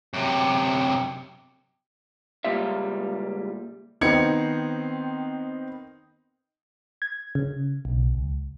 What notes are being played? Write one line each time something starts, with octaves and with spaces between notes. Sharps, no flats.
F#2 C3
C#2 A#2 G3 F4 E5
D#3 B3 C4 D#4 G#6 C#7
G#6
C#3
B1
C#2